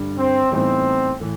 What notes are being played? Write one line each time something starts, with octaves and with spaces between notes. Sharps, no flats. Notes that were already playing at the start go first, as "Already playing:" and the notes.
Already playing: G2 D3 G3
C4
A2 E3 G3 B3 C4 D#4
A2 E3